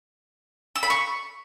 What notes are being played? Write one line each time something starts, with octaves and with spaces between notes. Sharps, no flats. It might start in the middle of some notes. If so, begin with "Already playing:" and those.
E6
B5
C#6